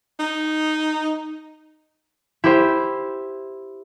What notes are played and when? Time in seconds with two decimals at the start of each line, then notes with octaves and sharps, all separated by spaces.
0.19 D#4
2.44 E4 G4 C5